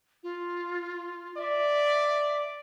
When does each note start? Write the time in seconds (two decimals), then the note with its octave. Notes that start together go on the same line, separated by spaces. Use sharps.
0.23 F4
1.37 D5 E5